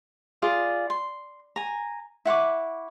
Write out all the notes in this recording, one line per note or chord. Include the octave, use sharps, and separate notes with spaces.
F4 G#4 D5
C6
G#5 A#5
E4 F#5 C#6 D6